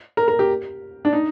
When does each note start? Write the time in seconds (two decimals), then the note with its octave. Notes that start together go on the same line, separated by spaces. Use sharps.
0.17 A#4
0.28 A#4
0.39 G4
1.05 D4
1.13 D#4